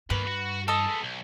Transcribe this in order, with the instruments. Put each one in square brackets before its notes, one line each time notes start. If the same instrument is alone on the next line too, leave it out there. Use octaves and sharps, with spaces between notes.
[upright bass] G2 [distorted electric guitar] D#3 A#3 [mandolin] B4
[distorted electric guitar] F#4
[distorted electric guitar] E3 A5 [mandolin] A4 D#5
[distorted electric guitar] G#3 B3
B1